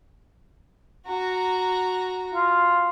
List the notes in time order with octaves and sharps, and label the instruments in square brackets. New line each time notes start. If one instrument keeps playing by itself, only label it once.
[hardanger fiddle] F#4 A#5
[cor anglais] F4